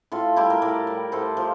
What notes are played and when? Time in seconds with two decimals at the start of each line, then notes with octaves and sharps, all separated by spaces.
0.12 A2 F4 A4
0.36 G3 E4 G4
0.50 G4 A#4
0.62 A2 A#4 D5
0.87 G3
1.12 A2 A4 C5
1.37 F3